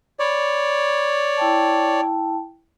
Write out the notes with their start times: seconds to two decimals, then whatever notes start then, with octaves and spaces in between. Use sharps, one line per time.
0.19 C#5 D5 B5
1.37 E4 G5 A5